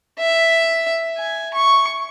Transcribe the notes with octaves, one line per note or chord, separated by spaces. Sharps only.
E5
G#5
C#6